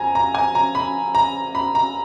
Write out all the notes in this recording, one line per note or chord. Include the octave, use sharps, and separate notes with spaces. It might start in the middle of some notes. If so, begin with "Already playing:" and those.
Already playing: F2 G#5 A#5
A#5
G#5
A#5
B5
A#5
B5
A#5